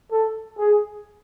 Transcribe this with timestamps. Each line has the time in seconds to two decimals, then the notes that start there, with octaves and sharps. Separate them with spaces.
0.12 A4
0.58 G#4